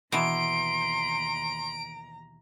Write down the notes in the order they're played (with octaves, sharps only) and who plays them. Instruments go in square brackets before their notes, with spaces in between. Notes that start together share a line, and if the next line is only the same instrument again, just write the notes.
[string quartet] D#2 A#5 [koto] B2 E3 [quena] C6 [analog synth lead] D7